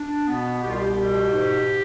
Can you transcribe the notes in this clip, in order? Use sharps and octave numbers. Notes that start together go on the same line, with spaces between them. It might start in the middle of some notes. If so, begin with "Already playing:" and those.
Already playing: D4
B2 B3
C2 G4
F4
G4
B2
G#2